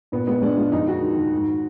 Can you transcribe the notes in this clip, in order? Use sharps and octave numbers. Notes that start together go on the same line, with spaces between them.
A#2 B3
G#3 B3
G#3 D4
G#3 F4
F2 D#4
D#3 F#4
D#3
D#3
G#2